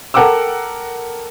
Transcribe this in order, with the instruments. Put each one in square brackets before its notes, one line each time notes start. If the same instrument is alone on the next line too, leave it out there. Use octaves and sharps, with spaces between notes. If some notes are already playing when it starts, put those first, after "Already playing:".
[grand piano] A4 A#4 F#5 G5 D6 E6